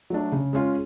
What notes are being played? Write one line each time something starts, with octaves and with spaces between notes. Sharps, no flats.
F#3 A3 D4
C#3
G#3 C#4 F4